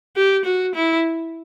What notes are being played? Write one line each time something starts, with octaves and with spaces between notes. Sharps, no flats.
G4
F#4
E4